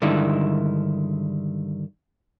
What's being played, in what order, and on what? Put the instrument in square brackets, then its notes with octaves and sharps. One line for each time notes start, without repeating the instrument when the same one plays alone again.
[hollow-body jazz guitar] G2 D3 D#3 G#3 E4